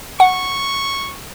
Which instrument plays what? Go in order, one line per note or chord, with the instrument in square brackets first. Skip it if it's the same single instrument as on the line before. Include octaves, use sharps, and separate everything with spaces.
[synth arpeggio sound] F#5 [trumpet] C#6